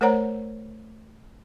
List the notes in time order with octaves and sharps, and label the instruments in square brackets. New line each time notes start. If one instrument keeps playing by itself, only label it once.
[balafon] A3 A#4 C5 C#5 F#5 A#5